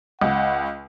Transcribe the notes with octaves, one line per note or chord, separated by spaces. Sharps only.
C#2 F#5